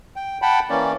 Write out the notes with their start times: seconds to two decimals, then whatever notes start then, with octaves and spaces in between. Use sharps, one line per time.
0.16 G5
0.42 F#5 G5 A5 B5
0.70 E3 A#3 C#4 D5